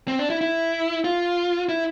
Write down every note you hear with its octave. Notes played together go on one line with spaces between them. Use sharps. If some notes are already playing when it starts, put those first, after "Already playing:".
C4
D4
E4
E4
F4
E4